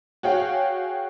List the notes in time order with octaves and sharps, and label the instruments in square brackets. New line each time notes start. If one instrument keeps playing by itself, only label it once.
[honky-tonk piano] F#4 G#4 C#5 F5 G5